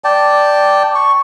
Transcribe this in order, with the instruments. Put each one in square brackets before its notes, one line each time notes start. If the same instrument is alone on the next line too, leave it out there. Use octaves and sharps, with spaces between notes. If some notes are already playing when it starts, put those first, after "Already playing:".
[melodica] D5 G5 A5
C#6